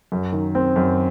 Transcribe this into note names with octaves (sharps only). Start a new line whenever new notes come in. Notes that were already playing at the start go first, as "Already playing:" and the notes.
F#2
D#3
C4
F#2